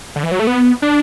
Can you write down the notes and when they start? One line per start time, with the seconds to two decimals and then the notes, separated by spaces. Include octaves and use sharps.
0.16 D3
0.23 E3
0.32 F#3
0.39 A3
0.47 B3
0.82 D4